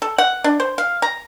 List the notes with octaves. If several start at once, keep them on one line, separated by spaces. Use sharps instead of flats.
A4
F#5
D4
C5
F5
A#5